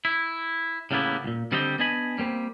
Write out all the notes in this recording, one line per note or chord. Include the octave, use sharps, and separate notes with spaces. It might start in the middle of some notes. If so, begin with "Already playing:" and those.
E4
A2 C#3 G3 A#3 B3 E4
C#2 A#2
D3 G3 C4 G4 D#5 G5
B3 D4 D#5 G#5 B5
G3 A#3 C4